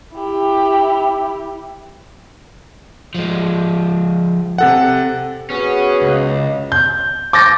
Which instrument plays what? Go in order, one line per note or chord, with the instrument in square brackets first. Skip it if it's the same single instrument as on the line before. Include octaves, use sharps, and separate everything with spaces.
[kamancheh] E4 G4
[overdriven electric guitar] F3 G#3
[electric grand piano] C3 A4 F#5
[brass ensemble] B3 F#4 G#4 [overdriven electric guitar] C#4
[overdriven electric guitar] C#2
[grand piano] G6
D6 G6 A6 A#6